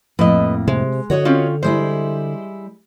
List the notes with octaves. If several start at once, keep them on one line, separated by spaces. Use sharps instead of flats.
F2 A2 A#3 B4 D#5
C3 G#3
D3 F#4 C#5 D#5
C4 C#4 F4
G3 G#3 E4 C5